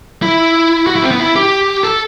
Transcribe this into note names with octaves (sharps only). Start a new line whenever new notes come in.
E4
F#4
E4
C4
B3
E4
G4
A4